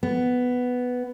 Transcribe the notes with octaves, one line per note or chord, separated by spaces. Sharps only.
B3